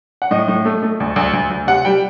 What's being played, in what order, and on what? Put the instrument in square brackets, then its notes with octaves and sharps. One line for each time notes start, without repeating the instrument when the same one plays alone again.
[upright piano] F#5
A2 D#5
A2
A3
A3
D2
D2
D2
D2
C3 F#5
G3 G5